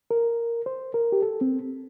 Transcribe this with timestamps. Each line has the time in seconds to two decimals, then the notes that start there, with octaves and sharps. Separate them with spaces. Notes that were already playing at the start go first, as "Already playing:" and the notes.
0.11 A#4
0.66 C5
0.94 A#4
1.12 G4
1.22 A4
1.41 C4